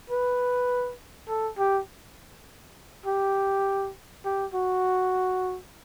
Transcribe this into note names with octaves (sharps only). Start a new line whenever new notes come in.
B4
A4
G4
G4
G4
F#4